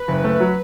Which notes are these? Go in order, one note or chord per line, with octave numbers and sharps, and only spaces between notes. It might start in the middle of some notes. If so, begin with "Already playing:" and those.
Already playing: B4
F#1
A3
F#3